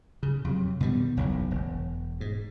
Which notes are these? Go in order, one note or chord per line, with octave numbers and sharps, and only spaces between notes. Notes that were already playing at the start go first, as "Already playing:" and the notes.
C#3
F2 C3 F#3
B2 D#3 E3 G3
F#1 B1 E2
E1
G#2